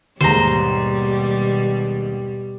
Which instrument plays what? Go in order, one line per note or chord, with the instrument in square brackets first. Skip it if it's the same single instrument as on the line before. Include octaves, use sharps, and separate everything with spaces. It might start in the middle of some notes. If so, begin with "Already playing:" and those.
[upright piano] D#2 G#2 [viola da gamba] B2 G3 [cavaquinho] C5 A#5